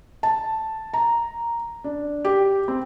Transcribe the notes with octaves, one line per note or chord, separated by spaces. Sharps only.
A5
A#5
D4
G4
C4